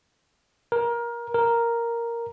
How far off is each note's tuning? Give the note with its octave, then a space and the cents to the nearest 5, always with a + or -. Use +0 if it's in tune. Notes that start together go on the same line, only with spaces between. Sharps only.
A#4 +20
A#4 +0